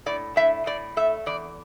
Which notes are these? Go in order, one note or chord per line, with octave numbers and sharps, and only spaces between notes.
A2 D5
A2 E5
A2 D5
A3 E5
E2 D5